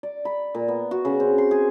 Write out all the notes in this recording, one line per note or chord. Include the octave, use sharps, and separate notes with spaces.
D5
B5
A#2
B3
F#4
C#3
C4
C6
G#4